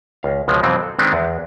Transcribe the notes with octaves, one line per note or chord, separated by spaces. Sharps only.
C#2 F5
C#2 B2 F3 G#3
F2 B2 E3 F#3 C4
A4
D#3 G#3 B3 C4 D4
E2